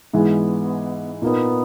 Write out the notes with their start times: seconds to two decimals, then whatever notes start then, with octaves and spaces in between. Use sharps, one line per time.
0.13 G#2 E3 G#3 B3
1.22 A#2 A#3 B3 D#4